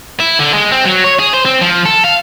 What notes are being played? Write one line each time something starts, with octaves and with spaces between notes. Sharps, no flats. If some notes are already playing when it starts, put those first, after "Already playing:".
E4
D3
G#3
C4
F#3
C#5
G#4
C5
C4
F3
A4
F5